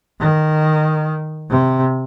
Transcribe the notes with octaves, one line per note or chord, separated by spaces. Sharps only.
D#3
C3